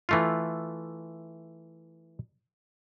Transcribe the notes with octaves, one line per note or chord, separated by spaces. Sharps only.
E3 A3 F4